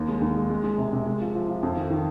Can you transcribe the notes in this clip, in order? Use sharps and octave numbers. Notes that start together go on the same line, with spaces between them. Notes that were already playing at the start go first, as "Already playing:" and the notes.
Already playing: D#2
G#3
D#2
G#3
G#3
G#3
C3
C3
G#3
F3
F3
F3
F2
D#3
D#3